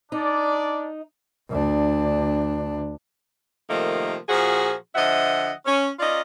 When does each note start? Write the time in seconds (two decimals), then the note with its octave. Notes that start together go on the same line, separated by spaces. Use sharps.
0.12 D4 D#4 D5
1.51 D2 D4
3.70 C3 D#3 F3 A3 A#3
4.29 A#2 F3 F#4 G#4
4.95 D3 F3 D#5 E5 F#5
5.66 C#4
6.00 C#4 F4 A#4 D5 D#5